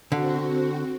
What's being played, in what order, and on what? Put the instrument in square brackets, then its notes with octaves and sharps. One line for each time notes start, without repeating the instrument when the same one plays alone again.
[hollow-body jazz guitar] D3 [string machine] C4 F#4